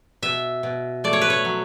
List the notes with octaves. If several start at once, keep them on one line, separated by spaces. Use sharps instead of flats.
B2 E5
B2
A3 D5
C#5
B4
C#5
F#3